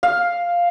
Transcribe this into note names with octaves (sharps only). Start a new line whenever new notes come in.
F5